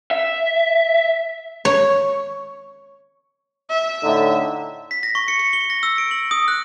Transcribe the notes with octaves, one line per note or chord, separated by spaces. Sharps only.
E5
C#5
E5
A2 D3 D#4
B6
A#6
C#6
C#7
C#7
G7
A#6
E6
D7
F#7
D#6
F#6